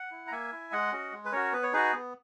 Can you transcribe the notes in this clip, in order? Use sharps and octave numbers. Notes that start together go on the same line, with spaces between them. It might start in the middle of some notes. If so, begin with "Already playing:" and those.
Already playing: F#5
E4
A#5
A#3 E5 G#5
E4
G#3 D#5 F#5
C#4 F#4
G#3
B4
C#4 F#4 A#4 C#5
B3 B4
C#5
D#4 F#4 G#4 B4
B3